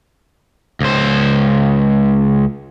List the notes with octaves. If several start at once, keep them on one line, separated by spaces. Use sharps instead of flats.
C#2 C5